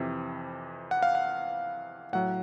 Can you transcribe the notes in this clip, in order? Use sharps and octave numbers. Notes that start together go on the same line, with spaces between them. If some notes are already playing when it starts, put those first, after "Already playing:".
Already playing: F2 C3 E3
F#5
F5
F#5
A2 F#3 F#5